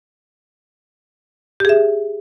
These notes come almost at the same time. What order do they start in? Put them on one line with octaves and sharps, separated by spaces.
G4 G#4 E5